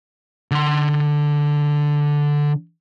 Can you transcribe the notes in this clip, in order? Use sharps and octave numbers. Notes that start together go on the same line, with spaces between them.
D3 C6